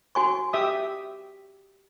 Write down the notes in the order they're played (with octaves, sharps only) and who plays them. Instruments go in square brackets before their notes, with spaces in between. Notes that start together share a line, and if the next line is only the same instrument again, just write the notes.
[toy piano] F#4 G#5 C#6
[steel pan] G4 E5 D#6